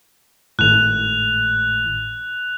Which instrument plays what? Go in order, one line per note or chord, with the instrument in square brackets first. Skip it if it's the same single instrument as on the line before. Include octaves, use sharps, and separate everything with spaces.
[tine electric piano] G#1 A2 [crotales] F#6 F7